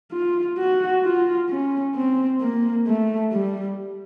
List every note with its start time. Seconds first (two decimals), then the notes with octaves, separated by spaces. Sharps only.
0.12 F4
0.58 F#4
1.04 F4
1.49 C#4
1.95 C4
2.41 A#3
2.87 A3
3.32 G3